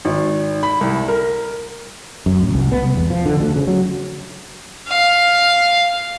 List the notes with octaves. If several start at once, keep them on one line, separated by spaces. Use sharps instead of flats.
G#1
B5
C2
A#4
F#2
D1
C2
B3
C2
E2
F3
D3
D2
C#3
F#3
F5